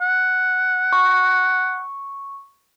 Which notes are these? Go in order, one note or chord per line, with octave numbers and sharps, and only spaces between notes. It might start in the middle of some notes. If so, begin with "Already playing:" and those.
F#5
C#6